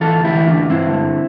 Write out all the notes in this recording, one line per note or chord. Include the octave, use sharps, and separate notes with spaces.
E3 F4 A4
D2
E4 G4
E3
D4 F4
D2
G2 C4 E4
D3